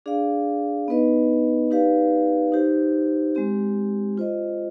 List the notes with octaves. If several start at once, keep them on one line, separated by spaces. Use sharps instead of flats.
D4 G#4 D5 F5
B3 D#4 B4 D#5
D#4 G4 B4 D5 F5
D#4 G4 C5
G#3 C4 G4
F4 C5 D#5